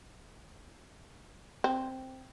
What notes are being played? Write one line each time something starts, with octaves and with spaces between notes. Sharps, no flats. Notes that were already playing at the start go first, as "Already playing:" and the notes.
C4